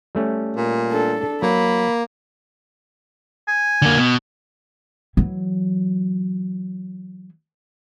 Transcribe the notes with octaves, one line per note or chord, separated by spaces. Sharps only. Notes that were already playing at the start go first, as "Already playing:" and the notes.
G3 A3 C#4
A#2
D4 A4
F#3 A#3 B5
G#5
D3 A#3
B2
E3 F#3